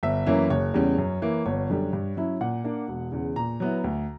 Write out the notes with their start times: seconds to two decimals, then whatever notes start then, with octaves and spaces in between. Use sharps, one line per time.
0.03 G1 E5
0.26 F#2 E3 A#3 C#4
0.50 F#1 C#5
0.74 E2 C#3 G3 C#4
0.98 F#2
1.22 E3 A#3
1.46 G1 C#5
1.69 F#2 D3 G3
1.93 G2
2.17 F#3 C#4 E4
2.41 A#2 F#5
2.64 A#3 D4
2.88 E1
3.12 E2 C#3
3.36 A#2 A#5
3.60 F#3 B3 E4
3.84 D2